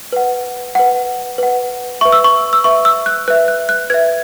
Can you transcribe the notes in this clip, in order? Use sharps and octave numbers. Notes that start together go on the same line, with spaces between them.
B4 F#5
B4 F#5
B4 F#5
B4 E5 C#6
E6
C#6
E6
B4 E5 C#6
E6
F#6
B4 E5 F#6
F#6
F#6
B4 E5 G#6